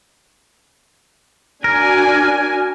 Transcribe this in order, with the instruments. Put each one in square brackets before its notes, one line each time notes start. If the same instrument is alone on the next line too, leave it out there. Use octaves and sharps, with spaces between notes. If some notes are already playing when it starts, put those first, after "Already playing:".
[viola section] D4 F#4 G#5 [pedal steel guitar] A#4